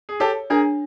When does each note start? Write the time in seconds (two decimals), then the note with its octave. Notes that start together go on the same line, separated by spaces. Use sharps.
0.09 G#4
0.20 G4 A4 C#5
0.50 D4 G#4 A#4